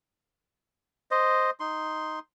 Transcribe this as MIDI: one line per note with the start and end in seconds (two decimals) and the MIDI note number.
1.11 1.50 72
1.11 1.50 75
1.60 2.19 63
1.60 2.19 84